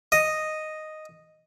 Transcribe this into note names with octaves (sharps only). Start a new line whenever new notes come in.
D#5